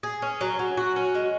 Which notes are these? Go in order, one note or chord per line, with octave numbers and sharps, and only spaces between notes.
G#4
C#4
F#3
F#3
F#4
C#4
G#3